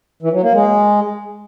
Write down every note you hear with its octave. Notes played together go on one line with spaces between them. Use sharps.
E3
F#3
A#3
G#3